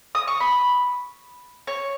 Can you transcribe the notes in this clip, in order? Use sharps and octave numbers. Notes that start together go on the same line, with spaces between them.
D#6
C#6
B5
C#5